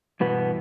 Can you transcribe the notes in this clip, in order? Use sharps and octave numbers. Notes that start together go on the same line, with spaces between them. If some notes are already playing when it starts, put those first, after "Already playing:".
G2 B2 E3 B3